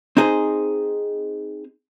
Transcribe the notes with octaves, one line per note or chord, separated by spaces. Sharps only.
C4 D#4 G#4 C5